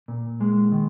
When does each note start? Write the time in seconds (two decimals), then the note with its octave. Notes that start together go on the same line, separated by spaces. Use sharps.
0.08 A#2
0.41 G#3
0.72 D#3